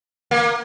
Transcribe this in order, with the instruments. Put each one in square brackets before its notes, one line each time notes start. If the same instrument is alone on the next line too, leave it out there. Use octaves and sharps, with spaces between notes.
[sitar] A#3